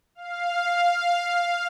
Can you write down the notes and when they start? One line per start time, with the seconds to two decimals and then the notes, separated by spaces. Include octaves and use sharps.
0.15 F5